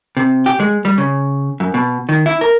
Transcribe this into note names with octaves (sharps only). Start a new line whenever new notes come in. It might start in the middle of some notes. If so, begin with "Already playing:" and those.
C3
G4
G#3
G3
C#3
F#2
B2
D#3
E4
A#4